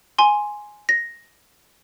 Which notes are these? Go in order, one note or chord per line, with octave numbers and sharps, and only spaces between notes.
G#5 C6
A#6